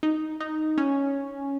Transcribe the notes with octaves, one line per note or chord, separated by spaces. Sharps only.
D#4
D#4
C#4